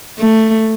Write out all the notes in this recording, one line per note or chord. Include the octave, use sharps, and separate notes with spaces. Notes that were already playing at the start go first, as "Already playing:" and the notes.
A3